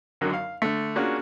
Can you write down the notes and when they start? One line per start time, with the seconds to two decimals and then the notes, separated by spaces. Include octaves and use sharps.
0.21 G#1 F#2 D3 F#3 A#4
0.33 F5
0.62 D3 A3
0.95 A#3 C#4 D4 F4 F#4 G#4